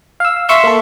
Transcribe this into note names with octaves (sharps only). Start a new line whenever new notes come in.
F5 E6
E5 C6 C#6 E6
A#3 A4